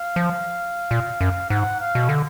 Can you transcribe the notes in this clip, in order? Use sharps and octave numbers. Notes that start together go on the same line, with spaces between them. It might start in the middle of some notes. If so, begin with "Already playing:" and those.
Already playing: F5
F3
A#2
F#2
G#2 F#5
F5
B2
D3